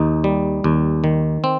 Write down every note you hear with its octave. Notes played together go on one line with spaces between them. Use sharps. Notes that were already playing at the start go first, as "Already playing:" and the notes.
Already playing: D#2 D#4
G3
D#2
D#3
C4